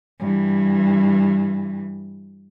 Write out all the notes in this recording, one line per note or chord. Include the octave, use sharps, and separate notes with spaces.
G2 E3